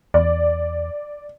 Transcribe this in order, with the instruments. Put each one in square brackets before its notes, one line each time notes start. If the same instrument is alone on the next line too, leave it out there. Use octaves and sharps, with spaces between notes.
[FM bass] E2 [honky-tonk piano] D5